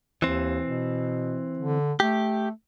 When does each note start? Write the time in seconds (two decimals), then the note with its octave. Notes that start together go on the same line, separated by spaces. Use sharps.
0.22 D#2 E3 C4
0.66 B2
1.59 D3
2.00 A3 G4